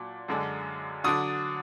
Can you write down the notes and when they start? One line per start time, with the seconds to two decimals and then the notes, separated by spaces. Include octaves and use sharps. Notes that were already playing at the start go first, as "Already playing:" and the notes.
Already playing: A#2 F#3 D4
0.28 F#2 D3 G#3 D4
1.04 D3 F#3 D4 D#6